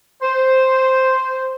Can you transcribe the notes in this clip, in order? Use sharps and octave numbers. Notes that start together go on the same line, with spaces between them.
C5